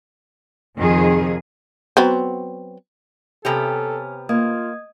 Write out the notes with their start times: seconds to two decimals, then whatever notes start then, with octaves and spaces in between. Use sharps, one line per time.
0.77 F2 C3 D#3 G#4
1.97 F#3 B3 C4
3.45 C3 B3 G4 A4 C#5 G#5 F6
4.29 A#3 F4 D#5 D#6 G#6